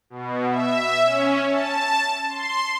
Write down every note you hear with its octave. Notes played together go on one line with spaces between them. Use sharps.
B2
E5
C#4
A5
C6